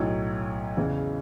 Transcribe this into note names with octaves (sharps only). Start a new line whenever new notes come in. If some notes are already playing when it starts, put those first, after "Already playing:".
Already playing: B1 A2 F#3 C#5
E2 C#3 E3